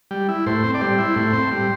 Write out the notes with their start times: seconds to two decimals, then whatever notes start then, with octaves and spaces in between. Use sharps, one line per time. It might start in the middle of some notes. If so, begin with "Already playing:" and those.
0.11 G3
0.29 E4
0.46 A2 C5
0.64 C4
0.74 D5
0.81 G3 C5
0.98 E4
1.16 A2
1.33 C4
1.51 G3